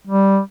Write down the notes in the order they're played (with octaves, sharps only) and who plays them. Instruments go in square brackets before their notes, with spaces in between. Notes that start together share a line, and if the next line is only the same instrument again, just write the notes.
[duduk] G3